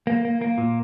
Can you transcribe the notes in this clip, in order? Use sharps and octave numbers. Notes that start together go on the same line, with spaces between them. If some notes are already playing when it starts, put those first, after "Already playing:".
A#3
A#3
A#3
A#2